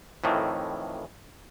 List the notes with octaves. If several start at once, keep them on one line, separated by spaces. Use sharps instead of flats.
F2 A2 D#3 E3